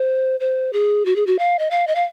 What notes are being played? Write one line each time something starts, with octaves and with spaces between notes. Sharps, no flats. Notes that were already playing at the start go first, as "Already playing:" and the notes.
Already playing: C5
C5
G#4
F#4
G#4
F#4
F5
D#5
F5
D#5
F5